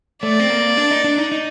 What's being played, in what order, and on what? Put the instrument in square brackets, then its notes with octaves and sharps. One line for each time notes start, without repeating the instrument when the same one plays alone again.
[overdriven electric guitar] A3 [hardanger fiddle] D5
[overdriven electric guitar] C4
A#3
D4
D#4
D4
D#4
D#4